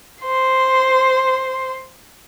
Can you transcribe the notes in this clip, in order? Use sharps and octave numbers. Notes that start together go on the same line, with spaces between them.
C5 C6